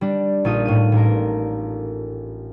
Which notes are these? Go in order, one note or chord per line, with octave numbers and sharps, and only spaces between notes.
G3 D4
A#1 D#4 F4 D#6
A2 D#7
A1 A#4